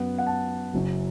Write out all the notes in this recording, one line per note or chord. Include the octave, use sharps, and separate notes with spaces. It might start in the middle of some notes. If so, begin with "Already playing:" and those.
Already playing: F#2 F#3 B3 F#5
F#5
A5
F#1 F#2 F#3 C#4